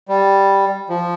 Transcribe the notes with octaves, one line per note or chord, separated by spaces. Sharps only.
G3
F3